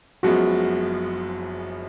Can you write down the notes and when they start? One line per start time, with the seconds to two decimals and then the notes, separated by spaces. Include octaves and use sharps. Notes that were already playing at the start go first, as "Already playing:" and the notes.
0.23 F#1 F#2 F3 G#3 B3 F#4